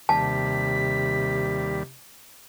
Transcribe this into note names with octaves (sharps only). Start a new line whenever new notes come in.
D#2 C3 G3 A5 B6